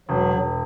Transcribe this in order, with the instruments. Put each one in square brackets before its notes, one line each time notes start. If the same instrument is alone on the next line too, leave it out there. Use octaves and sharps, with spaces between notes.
[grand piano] E1 [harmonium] F#3
[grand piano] E1